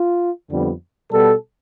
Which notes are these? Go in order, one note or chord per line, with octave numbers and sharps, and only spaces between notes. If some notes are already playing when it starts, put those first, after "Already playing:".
Already playing: F4
F2 D3 G3 B3
B2 G3 B3 A4